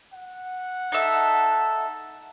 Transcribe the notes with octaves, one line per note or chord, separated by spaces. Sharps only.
F#5
D#4 A4 E5